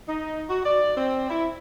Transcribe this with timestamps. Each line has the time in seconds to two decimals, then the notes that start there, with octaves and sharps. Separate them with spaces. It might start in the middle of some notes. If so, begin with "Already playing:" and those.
0.08 D#4
0.49 F#4
0.65 D5
0.96 C4
1.30 E4